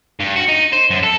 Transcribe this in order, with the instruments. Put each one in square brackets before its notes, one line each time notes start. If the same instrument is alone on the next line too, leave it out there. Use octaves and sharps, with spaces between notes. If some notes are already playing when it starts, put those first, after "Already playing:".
[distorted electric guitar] G2
F#4
D#4
C5
F#2
A4